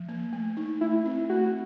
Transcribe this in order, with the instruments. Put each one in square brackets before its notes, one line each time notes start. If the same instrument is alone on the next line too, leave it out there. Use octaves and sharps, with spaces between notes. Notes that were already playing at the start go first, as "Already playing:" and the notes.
Already playing: [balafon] F3
A#3
A3
D#4
[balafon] A3 [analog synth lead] E4
[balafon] C4
[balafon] A3 [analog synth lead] F#4